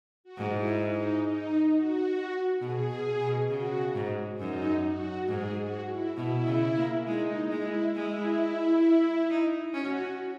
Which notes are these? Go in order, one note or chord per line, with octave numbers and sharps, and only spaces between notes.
F#4
G#2
E4
D#4
D#4
F#4
B2 G#4
B2
B2
C#3 F#4
G#2
F#2 D#4
F#4
G#2 G#4
F#4
E4
B2 E4
C#3
A#3
G#3 D#4
G#3 E4
G#3 E4
D#4
C#4 F#4